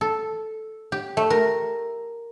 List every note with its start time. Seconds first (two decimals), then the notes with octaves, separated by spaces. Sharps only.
0.01 A4
0.92 G4
1.17 A3
1.30 A#4